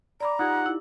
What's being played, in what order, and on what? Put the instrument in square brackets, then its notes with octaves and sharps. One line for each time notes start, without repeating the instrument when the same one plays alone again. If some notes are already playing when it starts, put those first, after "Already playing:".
[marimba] D5 B5 D6 [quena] A#5
[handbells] D#4 F4 G4 [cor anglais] F#5 [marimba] D#6 G#6
[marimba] E4